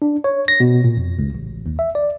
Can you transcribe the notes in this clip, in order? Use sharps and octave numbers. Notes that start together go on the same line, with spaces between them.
D4
C#5
A#6
B2
A#2
F2
C#2
A1
D#2
E5
D5